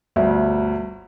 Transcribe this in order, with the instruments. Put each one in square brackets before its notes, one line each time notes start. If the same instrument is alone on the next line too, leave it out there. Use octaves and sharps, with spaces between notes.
[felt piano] G1 D2 E5